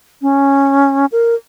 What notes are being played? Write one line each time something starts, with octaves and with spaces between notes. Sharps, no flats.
C#4
A#4